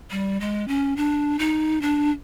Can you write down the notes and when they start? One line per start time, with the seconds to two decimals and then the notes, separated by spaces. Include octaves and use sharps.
0.11 G3
0.40 G#3
0.68 C#4
0.97 D4
1.39 D#4
1.82 D4